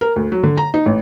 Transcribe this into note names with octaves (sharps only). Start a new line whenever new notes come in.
A#4
D2
F#3
D3
A#5
D#4
A1